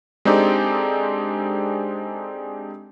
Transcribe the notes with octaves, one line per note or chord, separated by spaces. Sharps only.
G#3 C4 D4 D#4 G4 A4